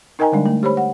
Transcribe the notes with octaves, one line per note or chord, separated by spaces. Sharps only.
D#4 A#4 D#5 G5 G#5 A#5
D3 G3 G#3 D4 D5
A3
G4 C5 C#5 B5
F#5